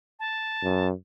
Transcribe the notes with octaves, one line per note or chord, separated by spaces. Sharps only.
A5
F#2